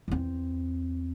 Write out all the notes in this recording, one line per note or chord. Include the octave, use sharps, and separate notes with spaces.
E2 C4